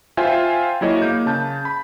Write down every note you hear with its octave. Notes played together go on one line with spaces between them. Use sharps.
F4 C5 E5 G5 G#5
F#3 A#3 E4 G#4 C#5 D#5
A#3 G6
C#3 A5 G6
B5